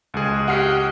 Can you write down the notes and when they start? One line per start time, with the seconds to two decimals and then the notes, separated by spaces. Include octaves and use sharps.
0.14 C#2 G#3 G#4
0.48 G4 F#5 F6 C7